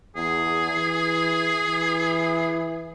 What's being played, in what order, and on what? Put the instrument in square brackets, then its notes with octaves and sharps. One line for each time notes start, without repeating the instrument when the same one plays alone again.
[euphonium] E2 [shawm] G#4
[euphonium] E3
E3